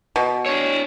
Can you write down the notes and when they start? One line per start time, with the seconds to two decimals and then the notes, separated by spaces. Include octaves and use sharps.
0.16 B2
0.46 D4 C#5